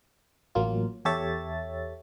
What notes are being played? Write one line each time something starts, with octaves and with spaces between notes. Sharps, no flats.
A1 F#3 A#3 F4
E2 G4 A4 C#5 E5 A6